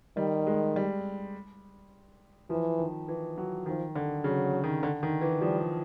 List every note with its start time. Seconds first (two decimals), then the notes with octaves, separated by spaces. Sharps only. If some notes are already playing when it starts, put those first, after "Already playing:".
0.17 D#3 G3
0.47 G#3
0.76 G3
2.50 E3 F3
2.79 D#3
3.08 E3
3.38 F#3
3.66 D#3 F3
3.96 D3
4.24 C#3 F#3
4.64 D#3
4.83 D3
5.03 D#3
5.21 E3
5.41 F3 G3